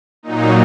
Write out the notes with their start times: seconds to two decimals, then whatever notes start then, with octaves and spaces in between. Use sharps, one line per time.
0.23 A#2 F#3 D#4